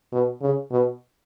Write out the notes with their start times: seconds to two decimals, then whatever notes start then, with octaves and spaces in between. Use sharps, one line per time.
0.12 B2
0.41 C#3
0.71 B2